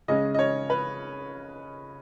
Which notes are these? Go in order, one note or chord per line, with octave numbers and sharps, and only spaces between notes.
C#3 G#3 C#4 D#5
D#5
C#5
B4